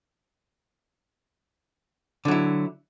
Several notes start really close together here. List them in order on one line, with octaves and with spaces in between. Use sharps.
D3 F#3 E4